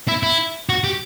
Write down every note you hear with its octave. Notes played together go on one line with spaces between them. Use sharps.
E4
E4
F#4
G4